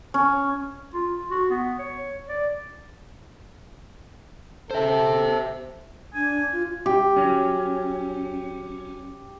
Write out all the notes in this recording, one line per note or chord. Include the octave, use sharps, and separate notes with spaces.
C#4
F4
F#4
B3
C#5
D5
A4 C5 E5
D4 G#5
F4
G4
F#3 C#4